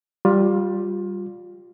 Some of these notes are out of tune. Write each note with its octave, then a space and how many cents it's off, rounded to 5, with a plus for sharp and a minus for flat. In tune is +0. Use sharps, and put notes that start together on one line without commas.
G3 +0 F4 +20